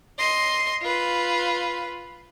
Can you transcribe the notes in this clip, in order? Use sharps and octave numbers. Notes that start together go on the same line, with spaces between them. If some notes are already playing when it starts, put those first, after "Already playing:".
D#5 C6
F4 B4